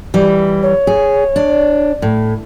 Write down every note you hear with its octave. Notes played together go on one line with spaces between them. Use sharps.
E3 G3
C#5
G#4
D4
A2